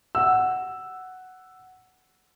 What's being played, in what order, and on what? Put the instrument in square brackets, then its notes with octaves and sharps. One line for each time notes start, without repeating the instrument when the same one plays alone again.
[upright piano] F#5 E6